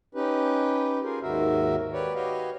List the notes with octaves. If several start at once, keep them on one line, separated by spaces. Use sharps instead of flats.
C#4 D#4 G4 B4
F4 G#4 A#4
D#2 G#2 D#3 F#4 A#4 E5
G4 B4 C#5 D5
F#4 G4 B4 C#5 D#5 F5